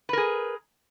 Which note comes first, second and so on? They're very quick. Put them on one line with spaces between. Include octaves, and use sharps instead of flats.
B4 A#4 G#4